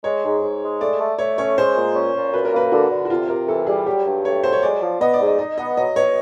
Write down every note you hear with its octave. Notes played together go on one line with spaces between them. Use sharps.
G#3 C#5
G#2
G#2
G#3
A3 D5
A3
A3 C#5
C#4 C#5
G#3 C5
A#2
C#4
A#2
F#2 B4
A#4
A#3 B4
D3 F#4
D3
F#4
C3 F4
C3 A#4
E3 A4
G3 G#4
F#3 G4
G2
A3 C#5
F#3 C5
C#5
G#3 D5
F3
B3 D#5
D5
G#2
D#5
D#4 D#5
B3 D#5
F#3 D#5
B2 C#5